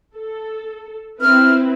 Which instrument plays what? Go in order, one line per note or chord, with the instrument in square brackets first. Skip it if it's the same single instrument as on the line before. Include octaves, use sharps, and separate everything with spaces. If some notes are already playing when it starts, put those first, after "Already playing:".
[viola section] A4
[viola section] C4 E4 B4 [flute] F6